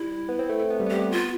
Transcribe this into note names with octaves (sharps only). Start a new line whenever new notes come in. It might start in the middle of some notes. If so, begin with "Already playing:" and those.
Already playing: G3 E4
B3
C4
A3
A3
B3
G3
B3
A3 G4
B3
F4